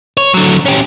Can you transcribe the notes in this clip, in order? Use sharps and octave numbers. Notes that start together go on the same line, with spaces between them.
C#5
D3 F#3
C#4 G4